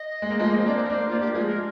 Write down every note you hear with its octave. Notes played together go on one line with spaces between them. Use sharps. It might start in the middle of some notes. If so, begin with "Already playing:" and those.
Already playing: D#5
G#3
A#3
F3 G#3
A#3
C4
A#3 D4 D5
C5
A#4
A#3 D4 C5
A#3 D4 F4
G4
F3 G#3 G#4
A#4